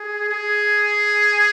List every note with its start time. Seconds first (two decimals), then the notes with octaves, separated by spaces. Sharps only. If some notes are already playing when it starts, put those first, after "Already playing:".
Already playing: G#4
0.30 G#4